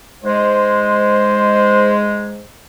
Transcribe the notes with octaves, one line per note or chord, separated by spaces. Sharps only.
G#2 G#3 C5